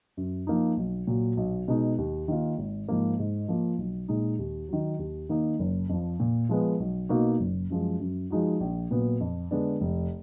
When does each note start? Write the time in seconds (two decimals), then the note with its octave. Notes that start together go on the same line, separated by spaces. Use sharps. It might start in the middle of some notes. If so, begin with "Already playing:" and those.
0.17 F#2
0.47 F3 A#3 D#4
0.77 B1
1.07 A#2 F#3
1.37 B1
1.68 B2 G#3 D#4
1.98 D#2
2.28 D#3 A#3 F4
2.58 G#1
2.88 G#2 F3 A#3
3.19 G#2
3.48 F3 A#3 F4
3.78 B1
4.08 A#2 G#3 D#4
4.39 D#2
4.69 D#3 F#3
4.99 D#2
5.29 D#3 A#3 D#4
5.59 F#1
5.89 F2 F3
6.20 A#2
6.49 F3 G#3 B3
6.80 B1
7.09 B2 A#3 D#4 F#4
7.40 F#1
7.70 F#2 F3 G#3
8.00 F#2
8.30 F3 G#3 D#4 F#4
8.61 A#1
8.91 A#2 F#3 B3
9.20 F2
9.51 D3 G#3 B3 D4
9.81 F1